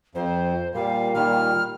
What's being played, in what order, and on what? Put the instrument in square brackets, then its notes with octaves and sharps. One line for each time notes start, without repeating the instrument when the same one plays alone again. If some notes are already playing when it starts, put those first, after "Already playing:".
[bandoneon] F2 [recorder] C5
[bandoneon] A#2 G3 [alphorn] A#3 [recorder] F5
[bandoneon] A#2 D#3 G3 [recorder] F6